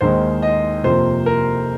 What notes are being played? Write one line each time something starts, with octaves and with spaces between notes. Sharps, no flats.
D#2 D#3 G#3 C5
D#5
F2 C3 F3 A#3 C5
A#4